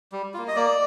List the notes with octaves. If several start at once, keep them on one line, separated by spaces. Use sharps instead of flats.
G3
A#3 F4
D#5
A#3 D5